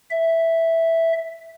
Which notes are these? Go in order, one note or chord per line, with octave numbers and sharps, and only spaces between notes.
E5